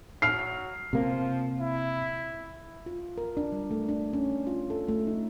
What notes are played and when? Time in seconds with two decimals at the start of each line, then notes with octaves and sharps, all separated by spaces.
0.22 F#3 F6 C7
0.93 C3 F3 A#3
1.61 E4
2.86 F4
3.18 A#4
3.37 D4
3.52 G3
3.71 A3
3.89 D4
4.13 C#4
4.47 F4
4.70 A4
4.88 A3
5.07 D#4